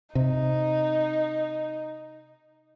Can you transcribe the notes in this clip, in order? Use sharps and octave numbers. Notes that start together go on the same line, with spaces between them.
C3 D#4